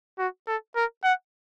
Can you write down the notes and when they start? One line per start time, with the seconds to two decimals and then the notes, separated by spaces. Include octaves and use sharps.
0.19 F#4
0.48 A4
0.76 A#4
1.04 F#5